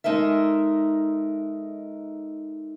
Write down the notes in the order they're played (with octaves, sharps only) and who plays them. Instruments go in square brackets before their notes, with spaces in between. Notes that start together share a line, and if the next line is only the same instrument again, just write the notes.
[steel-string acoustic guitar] G#3 D#4 A4 A#4 E5